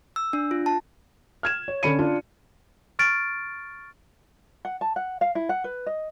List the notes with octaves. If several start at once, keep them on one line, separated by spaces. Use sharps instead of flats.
E6
D4
F4
A5
F6 G#6 E7
C#5
D3 C#4 B5 C#7 D#7
D4 F4
C#6 F6 A6 D7
F#5
A5
F#5
F5
E4
F#5
B4
D#5